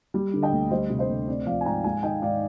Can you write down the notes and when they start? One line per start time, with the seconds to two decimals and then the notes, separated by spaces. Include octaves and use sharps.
0.14 G3
0.34 D3
0.42 D#5 G5
0.52 D2
0.71 G3 C5 D#5
0.90 C3
0.99 C5 D#5
1.08 D2
1.28 C4 D5
1.46 F3 D5 F5
1.61 G#5
1.65 G#2 G5 A#5
1.84 G#3 F5 G#5
2.03 D#3 D#5 G5
2.22 G#2 D5 F5